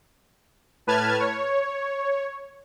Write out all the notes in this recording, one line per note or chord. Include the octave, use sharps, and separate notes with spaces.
A2 B4 A5 F6 G#6
C#5